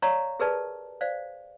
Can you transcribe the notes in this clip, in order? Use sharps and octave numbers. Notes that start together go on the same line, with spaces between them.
C#5 D5 F5 A#5 C#6
G4 G#4 A#4 B4 D5 A5
C5 D5 F5